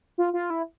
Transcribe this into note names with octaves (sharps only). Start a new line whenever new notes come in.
F4
F4
E4